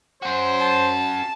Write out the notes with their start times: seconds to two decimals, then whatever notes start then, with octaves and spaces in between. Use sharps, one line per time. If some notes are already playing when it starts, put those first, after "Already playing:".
0.23 C#4 F#4 C5
0.59 A5